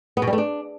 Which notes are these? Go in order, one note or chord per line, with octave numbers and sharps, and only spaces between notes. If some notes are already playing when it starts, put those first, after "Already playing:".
B3
B2
G3
A3
D4